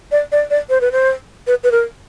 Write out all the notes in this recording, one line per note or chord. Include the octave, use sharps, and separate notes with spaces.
D5
D5
D5
C5
B4
C5
B4
B4
A#4